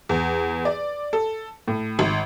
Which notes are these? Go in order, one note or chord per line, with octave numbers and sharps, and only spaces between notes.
E2
D5
A4
A2
G#1